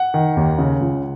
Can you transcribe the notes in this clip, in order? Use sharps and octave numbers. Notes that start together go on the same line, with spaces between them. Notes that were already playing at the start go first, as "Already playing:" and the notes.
Already playing: F#5
D#3
D#2
C#3
C#2